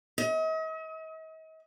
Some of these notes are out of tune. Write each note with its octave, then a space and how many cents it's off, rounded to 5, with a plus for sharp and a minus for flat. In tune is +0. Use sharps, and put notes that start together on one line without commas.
D#5 +40